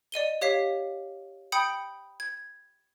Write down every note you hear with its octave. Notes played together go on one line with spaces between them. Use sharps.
D5 D#5 D#7 G7
G4 C#5 F5 B6 C7
G5 B5 D#6 G6 C#7 D7
G#6